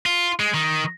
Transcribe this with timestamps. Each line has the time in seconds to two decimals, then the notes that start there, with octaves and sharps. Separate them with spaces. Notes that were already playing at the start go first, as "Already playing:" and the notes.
0.06 F4
0.40 G#3
0.54 D#3